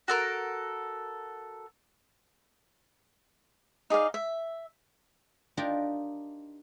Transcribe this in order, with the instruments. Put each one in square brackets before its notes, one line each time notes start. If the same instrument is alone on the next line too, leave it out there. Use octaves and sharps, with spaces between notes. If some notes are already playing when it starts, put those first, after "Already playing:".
[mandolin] F#4 A4 A#4
[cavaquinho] D#4 G#4 D5 F5
E5
[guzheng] D4 D#4 F4 G4 A#4